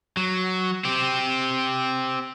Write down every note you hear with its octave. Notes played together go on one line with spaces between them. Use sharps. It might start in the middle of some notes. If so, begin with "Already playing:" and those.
F#3
C4 G4